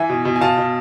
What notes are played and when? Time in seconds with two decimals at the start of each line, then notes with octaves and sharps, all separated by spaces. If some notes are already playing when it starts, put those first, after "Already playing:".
Already playing: E3 E5 G#5
0.09 B2
0.25 B2
0.36 G#5
0.41 B2 F5 A5
0.58 B2